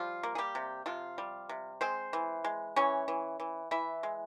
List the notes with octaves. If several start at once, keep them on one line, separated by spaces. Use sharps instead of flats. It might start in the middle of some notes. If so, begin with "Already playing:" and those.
Already playing: F3 G3 F4
A#3
G#4
G3 G4
C3
C3 F3 F4
G3
C3
G#3 C4 C5
E3
G#3
E3 C#4 C#5
E3
E3
E3 E4 E5
G#3